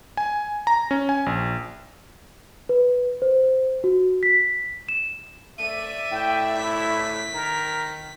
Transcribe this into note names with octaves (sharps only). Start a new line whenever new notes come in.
G#5
A#5
C#4
G#5
A#1
B4
C5
F#4
B6
E7
A3 D5 E5 D#7
A2 G5
E4 B6
D#3 A#4